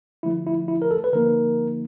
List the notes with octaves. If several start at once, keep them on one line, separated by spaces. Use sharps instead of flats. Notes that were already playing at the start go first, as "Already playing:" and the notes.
D3 F3 A3 E4
E4
E4
A#4
A4
B4
D3 F3 A#3 D#4 A#4